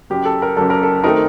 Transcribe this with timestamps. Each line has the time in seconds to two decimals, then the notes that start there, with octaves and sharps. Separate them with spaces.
0.10 F#1 F#2 F#3 G4
0.25 A4
0.42 A#4
0.57 F#1 F#2 F#3 A4
0.70 A#4
0.83 A4
1.04 D#3 A3 C4 D#4 A#4